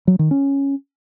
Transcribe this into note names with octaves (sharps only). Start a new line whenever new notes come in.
F#3
D#3
C#4